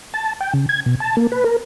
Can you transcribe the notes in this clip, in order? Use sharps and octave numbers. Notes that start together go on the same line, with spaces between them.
A5
G5
C#3
G#6
B2
A5
A#3
B4
A#4